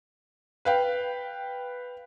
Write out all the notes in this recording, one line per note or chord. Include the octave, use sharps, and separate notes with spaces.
B4 F5 G5